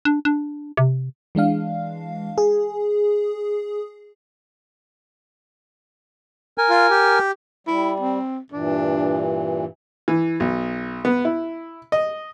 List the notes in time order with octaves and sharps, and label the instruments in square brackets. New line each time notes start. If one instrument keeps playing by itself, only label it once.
[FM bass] D4
D4
C3
[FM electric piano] E3 G#3 D4 F5
G#4
[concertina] A#4 G#5
[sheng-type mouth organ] F4
G4
[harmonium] G3 [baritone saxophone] E4
[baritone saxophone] C4
[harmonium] G2 A#2 E3 [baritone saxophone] D4
[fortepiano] E3
B1
B3
E4
D#5